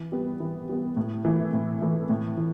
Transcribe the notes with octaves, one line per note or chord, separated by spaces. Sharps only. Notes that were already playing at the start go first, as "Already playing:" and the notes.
Already playing: E3
G3 B3
E3
G3 B3
A2
E3 A3 E4
A2
E3 A3 E4
A2
E3